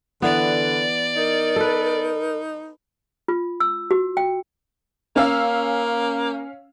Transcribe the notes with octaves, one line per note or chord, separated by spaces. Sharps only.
D3 E3 B3 D5
D#4 A#4
A4 B4
F4
E6
F#4
G5
A#3 C#4 F5 E6